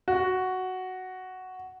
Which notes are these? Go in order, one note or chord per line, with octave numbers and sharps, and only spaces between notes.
F#4